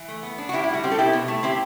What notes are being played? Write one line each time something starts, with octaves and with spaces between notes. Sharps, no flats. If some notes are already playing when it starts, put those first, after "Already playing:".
Already playing: E3
A3
B3
D4
F#4
A2 E4 G4
E4
G3 F#4
C4 G4
A4
B2 E4 G4
B2
A3
C4 E4 G4